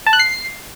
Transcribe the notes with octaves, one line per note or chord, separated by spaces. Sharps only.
A5
F#6
C7